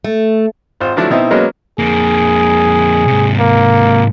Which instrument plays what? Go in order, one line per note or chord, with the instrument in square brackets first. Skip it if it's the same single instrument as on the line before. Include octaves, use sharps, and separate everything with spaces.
[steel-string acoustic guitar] A3
[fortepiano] G#1 F4 C5
D3 F3 F#3 A3 D4 E4
B2 C4 D#4 E4
F#3 G#3 A#3 B3 C#4
[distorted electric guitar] F2 A#3 [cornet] G#4
[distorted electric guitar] G#2 C3
[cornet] A#3